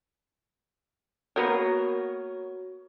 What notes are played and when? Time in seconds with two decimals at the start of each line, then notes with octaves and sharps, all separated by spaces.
1.36 A#3 B3 F#4 A#4 C#5